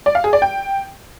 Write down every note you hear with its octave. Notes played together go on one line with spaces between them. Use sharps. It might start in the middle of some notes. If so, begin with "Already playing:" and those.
D5
F5
G#4
D5
G5